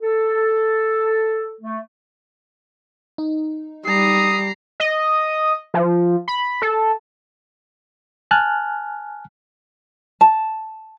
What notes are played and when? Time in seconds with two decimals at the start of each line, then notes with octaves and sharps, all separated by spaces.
0.01 A4
1.61 A3
3.18 D#4
3.87 G3 A#5 D#6 C7
4.80 D#5
5.74 F3
6.28 B5
6.62 A4
8.31 G#5 A5 F6 F#6
10.21 A5